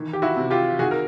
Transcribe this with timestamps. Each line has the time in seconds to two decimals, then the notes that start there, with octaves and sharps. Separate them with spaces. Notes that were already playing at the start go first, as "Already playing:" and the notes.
Already playing: D#3 E3
0.13 G4
0.22 E4 F#4
0.37 C3
0.51 F4 G4
0.79 D#3 F#4 G#4
0.91 A#4